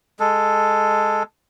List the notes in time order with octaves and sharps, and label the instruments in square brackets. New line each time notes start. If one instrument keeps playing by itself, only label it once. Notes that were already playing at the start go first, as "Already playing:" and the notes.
[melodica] G#3 A4